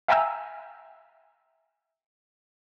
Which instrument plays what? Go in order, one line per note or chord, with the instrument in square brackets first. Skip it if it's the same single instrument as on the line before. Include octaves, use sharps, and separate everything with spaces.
[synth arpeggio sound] E5 F5 G5 G#5 A#5 E6